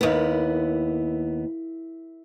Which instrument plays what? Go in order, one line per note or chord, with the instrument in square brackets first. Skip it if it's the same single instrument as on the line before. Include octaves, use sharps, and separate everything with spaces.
[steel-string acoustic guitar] D#2 B3 [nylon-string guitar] E4 A#4 F5